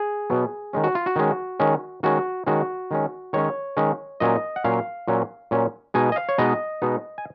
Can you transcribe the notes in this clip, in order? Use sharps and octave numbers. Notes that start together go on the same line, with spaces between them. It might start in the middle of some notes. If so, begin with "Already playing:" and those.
Already playing: G#4
B2 F#3 B3
D#3 G#3 C#4
F#4
F4
F#4
D#3 G#3 C#4
D#3 G#3 C#4
D#3 G#3 C#4 F#4
D#3 G#3 C#4 F#4
D#3 G#3 C#4
D#3 G#3 C#4 C#5
D#3 G#3 C#4
A#2 F#3 C#4 D#5
F#5
A#2 F#3 C#4 F5
A#2 F#3 C#4
A#2 F#3 C#4
B2 G#3 B3 D#4 G#5
D#5
F5
C#5
B2 G#3 B3 D#4 D#5
B2 G#3 B3 D#4
G#5